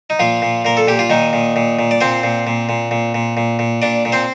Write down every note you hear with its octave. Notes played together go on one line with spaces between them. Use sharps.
D#4
A#2 F3 F4
A#2
A#2 A#4
A4
A#2 G4
F4
A#2 D#3 D#4
A#2
A#2
A#2
D5
A#2 C4 C5
A#2
A#2
A#2
A#2
A#2
A#2
A#2
A#2 D4 D5
A#2
C4 C5